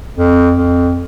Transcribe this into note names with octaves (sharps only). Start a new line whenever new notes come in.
F2
F2